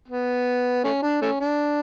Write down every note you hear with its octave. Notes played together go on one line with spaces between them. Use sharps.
B3
A3 C#4
D4
A3 C#4
D4